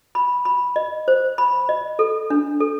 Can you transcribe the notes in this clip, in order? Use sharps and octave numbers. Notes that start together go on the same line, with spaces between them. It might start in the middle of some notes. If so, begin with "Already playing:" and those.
B5
B5
D#5
C5
B5
D#5
A4
D4
A4